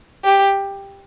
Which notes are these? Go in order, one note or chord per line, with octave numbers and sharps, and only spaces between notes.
G4